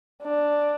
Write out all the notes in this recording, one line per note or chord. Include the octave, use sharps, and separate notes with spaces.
D4